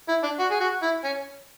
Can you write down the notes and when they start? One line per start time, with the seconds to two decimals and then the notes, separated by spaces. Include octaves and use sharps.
0.08 E4
0.23 D4
0.39 F#4
0.51 G#4
0.60 F#4
0.82 E4
1.04 C#4